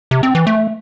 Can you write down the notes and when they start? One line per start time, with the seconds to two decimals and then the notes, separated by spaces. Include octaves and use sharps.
0.11 C3
0.23 C4
0.35 E3
0.47 A3